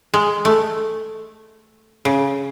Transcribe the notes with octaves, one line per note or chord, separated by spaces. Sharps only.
G#3
A3
C#3